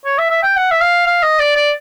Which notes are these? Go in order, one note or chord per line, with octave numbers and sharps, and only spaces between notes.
C#5
E5
E5
G5
F#5
E5
F5
F5
D#5
D5
D5